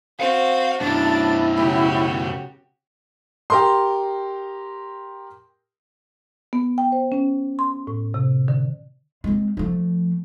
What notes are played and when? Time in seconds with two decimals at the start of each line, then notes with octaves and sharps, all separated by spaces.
0.20 C4 F#4 F5
0.81 F#2 B2 D4 E4 A6
1.58 C#3 F#4 G4
3.50 G4 A#4 C6
6.53 B3
6.78 G5
6.92 C5
7.12 C#4
7.59 C6
7.87 A2
8.14 C3
8.48 D3
9.24 G#3 C4
9.57 F3 A3